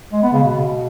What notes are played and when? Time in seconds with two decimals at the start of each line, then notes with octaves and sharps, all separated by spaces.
0.13 G#3
0.23 B3
0.33 C#3
0.43 B2